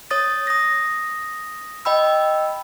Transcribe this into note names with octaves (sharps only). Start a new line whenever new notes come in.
C#5 D#6 A6
D#6 A#6
D#5 G5 B5 E6